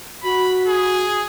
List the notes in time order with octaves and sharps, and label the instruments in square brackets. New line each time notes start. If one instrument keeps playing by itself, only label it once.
[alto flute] F#4 [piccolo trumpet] B5
[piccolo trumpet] G#4